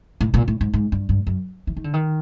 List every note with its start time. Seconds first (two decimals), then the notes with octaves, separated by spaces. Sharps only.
0.21 A2
0.34 A#2
0.48 A2
0.61 G#2
0.74 G#2
0.92 G2
1.09 G2
1.27 F#2
1.67 E3
1.77 D#3
1.84 D3
1.94 D#3